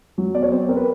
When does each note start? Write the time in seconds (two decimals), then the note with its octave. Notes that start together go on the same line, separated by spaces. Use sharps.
0.18 F#3
0.34 B3 D5
0.43 C#5
0.51 C4 C5
0.68 C4 A#4
0.77 B4